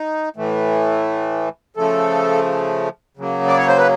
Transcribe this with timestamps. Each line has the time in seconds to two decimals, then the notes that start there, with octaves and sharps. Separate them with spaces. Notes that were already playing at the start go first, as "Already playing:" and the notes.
Already playing: D#4
0.36 A2 E3 A3
1.76 C#3 F3 A3 A4
3.17 C#3 F#3 A#3
3.48 D5
3.57 C#5
3.68 C5
3.78 B4